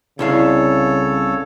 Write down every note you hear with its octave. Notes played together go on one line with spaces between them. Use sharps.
C2 C#3 E4 A4 C#5 F5